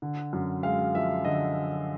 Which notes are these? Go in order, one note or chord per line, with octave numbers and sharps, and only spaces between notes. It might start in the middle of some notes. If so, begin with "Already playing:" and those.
D3
F#2
G#3 F5
F3 E5
D3 D#5